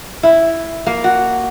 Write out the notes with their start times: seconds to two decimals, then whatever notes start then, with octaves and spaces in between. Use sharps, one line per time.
0.23 E4
0.87 A#3
1.04 F#4